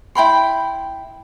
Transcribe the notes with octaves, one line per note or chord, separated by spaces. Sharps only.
E4 G5 B5 C6